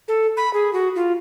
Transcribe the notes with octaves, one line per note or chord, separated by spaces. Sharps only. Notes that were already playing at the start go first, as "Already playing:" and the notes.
A4
B5
G#4
F#4
F4